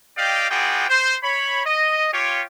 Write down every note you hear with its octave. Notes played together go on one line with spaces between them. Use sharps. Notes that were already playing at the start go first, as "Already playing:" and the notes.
G4 D5 D#5 F5 G5
B3 F4 F#4 G#4 D5 G5
C5
C#5 B5
D#5
F4 G4 C#5